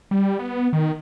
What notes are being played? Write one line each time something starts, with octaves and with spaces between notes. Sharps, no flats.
G3
B3
D#3